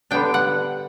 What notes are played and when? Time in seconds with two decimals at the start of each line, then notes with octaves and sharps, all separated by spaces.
0.11 D3 G3 B3 D4 G5
0.34 F#5